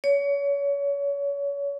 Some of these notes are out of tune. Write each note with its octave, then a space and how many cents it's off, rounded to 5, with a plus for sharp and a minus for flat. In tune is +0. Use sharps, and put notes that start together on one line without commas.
C#5 +30